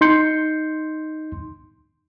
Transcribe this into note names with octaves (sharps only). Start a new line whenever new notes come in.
D#4 C6 G6 C#7